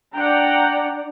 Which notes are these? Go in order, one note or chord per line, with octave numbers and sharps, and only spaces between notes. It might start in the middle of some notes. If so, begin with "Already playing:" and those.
D4 F#5 G5 A#5